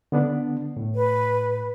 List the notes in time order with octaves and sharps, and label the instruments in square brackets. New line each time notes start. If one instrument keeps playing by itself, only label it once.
[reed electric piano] D3 B3 D4
A2
[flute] B4